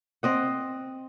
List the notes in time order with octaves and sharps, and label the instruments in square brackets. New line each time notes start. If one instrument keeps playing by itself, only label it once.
[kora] C4 D#5 F#5